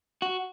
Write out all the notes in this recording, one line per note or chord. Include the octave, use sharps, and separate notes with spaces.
F#4